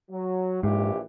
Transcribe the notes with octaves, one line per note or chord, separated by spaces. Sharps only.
F#3
A#1 G#2 E3 G4